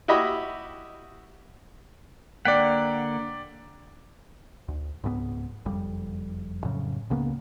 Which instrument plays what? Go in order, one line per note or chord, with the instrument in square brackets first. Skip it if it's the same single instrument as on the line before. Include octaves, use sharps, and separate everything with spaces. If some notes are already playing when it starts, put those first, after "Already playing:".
[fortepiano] E4 F#4 G4 D#5 E5 B5
[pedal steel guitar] D3 A#3 F#5 [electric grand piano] D5 G5 B6
[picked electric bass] D2
C#2 G#2 G#3 B3
F#1 F2 G3
F2 A2 C#3 F#3
C#2 C#3 A#3 B3